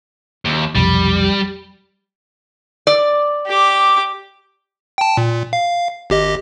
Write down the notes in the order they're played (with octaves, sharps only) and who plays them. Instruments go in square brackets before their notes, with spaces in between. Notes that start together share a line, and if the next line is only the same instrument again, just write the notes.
[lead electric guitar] D#2
[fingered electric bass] B1 F2 C3 [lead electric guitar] G3
[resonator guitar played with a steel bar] D5
[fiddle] G4 D6
[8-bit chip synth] G5 A5
A#2
F5
G#1 G4 D#5